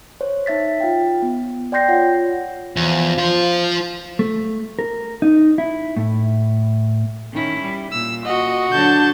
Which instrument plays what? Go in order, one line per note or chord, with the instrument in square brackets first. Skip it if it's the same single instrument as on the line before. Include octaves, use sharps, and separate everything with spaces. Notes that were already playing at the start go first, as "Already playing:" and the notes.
[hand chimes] C5 C#5
D#4 E5 A6 B6
F4 F5 G5
B3
D5 G5 C6 G6 A#6 C7
F4 C#5 F#5
[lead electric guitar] E2 [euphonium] F3
[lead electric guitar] F4 C5
[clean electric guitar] A3
A#4
D#4
E4
A2
[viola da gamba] D#3 C#4 E4
G3
[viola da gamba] A#2 [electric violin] E6
[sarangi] F#4 [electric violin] D#5
[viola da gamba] D3 F#3 D4 [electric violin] A5 G6